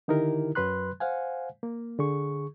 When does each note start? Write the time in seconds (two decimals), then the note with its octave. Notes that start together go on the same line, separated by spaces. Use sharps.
0.08 D3 D#3 D#4 E4 G4 A#4
0.55 F#2 F#3 B4 B5 C6 F#6
1.00 C5 F5 F#5 G#5
1.63 A#3
1.99 D3 G#4 C#6